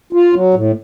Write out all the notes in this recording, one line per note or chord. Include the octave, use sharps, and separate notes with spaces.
F4
F#3
A2